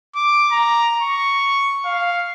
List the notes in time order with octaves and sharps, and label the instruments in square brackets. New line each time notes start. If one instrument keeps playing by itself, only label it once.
[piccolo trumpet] D6
A#5
C#6
F5